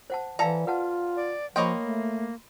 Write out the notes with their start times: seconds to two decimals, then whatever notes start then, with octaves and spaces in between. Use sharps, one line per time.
0.10 C5 F#5 A5
0.39 E3 A4 D5 F5 A#5
0.67 F4 B4 F#5 A5
1.17 D5
1.56 F3 A#3 C#5 D#5 G5 B5 C6
1.79 A3